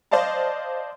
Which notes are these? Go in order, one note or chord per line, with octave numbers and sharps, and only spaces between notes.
C5 D5 D#5 F5 A5